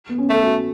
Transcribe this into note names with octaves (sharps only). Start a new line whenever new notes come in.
B3
C#4
A3 A4
F#4